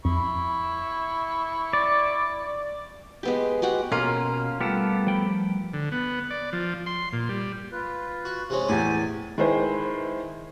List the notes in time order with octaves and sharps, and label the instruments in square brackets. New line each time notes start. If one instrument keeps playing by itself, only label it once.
[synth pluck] F2 [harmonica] E4 B5 C#6
[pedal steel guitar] D5
[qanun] G#3 B3 G4
G#3 F#4 G4 F#5
[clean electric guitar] B2 [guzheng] A#3 [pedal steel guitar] C#4 F4
[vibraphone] G3 A3 [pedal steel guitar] B3 G4 A4 [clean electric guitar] F4
[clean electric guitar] F3 G5 B5
[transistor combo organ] D3
B3
D5
F3
C6
A#2
G3
[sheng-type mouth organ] F4 B4
[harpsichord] F#4
C3 G#3 C#4
[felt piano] E2 A2 [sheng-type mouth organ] G4 G#5 [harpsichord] D5
[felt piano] D#3 G#3 E4 B4 C5